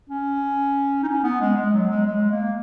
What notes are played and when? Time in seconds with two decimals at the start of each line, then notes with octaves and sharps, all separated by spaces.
0.10 C#4
1.03 D#4
1.08 C#4
1.24 B3
1.41 G#3
1.57 G#3
1.74 F#3
1.90 G#3
2.07 G#3
2.31 A#3